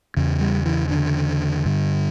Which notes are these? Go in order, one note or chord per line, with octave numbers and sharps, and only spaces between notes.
E2 C#3
G3
E3
D3
G2 D3